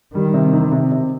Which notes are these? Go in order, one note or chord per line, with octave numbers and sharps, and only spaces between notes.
D#3 G3
C3
D#4
C3
C3